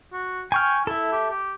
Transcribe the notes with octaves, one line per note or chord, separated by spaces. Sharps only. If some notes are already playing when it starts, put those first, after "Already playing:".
F#4
G5 G#5 C#6 F6
E4 A4 E5
G4
G4